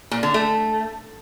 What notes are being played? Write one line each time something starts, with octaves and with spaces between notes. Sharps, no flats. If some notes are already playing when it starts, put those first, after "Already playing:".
A#2
D3
A3